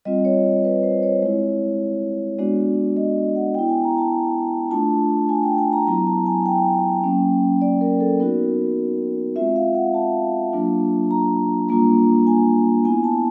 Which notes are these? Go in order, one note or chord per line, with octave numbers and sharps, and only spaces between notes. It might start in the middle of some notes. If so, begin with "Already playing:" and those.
G3 C4 F4 D#5
C#5
B4
C5
C#5
G#3 C4 E4 C#5
G#3 B3 D4 F#4 D5
D#5
F#5
B3 E4 G5
G#5
A#5
A5
A3 D4 F4 A5
G#5
G5
G#5
A#5
F#3 B3 E4 A#5
A5
G#5
G5
F#3 A#3 C#4
D5
A#4
A4
B3 D#4 F#4 A#4
G#3 C4 F4 E5
F5
F#5
A5
F#3 A#3 D4 F4
A#5
G3 A#3 D4 F4 A#5
G#5
B3 E4 G#5
A5